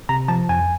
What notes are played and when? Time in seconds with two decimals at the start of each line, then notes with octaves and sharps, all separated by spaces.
0.09 C3 A#5
0.28 F3 A5
0.49 F2 G#5